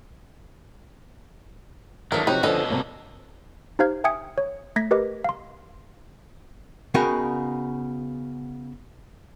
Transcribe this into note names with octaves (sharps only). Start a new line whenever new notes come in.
D#3 E3 F#3 G#3 A3 D4 A#4
C3 F3 F#3 D#4 F#4 G4 B4
B2 D3 F3 C#4 A4 B4 D#5
C3 G3 A#3
D#4 G4 C5 F5 F6 G#6
E5 G5 G#5 D#6 G#6 C#7
C#5
A3 G#6 A#6 B6
G4 A#4 B4 D#5 D6
F5 C6
C#3 B3 D#4 F#4 A#4 G5